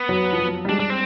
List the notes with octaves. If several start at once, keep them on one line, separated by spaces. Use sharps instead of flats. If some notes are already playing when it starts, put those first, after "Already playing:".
Already playing: B3
F#3
F3
F#3
G3
G#3 D4
D4
C4